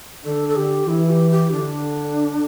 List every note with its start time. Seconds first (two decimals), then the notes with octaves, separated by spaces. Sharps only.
0.25 D3 D4 A4
0.49 A4
0.56 D3 G4
0.88 E3 E4
1.10 G4
1.31 G4
1.52 D3 D4